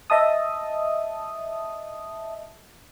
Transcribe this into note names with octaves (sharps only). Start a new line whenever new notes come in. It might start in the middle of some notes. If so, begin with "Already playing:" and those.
D#5 E5 A5 D#6